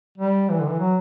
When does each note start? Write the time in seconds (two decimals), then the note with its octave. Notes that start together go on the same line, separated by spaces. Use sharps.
0.18 G3
0.49 E3
0.60 D3
0.70 E3
0.79 F#3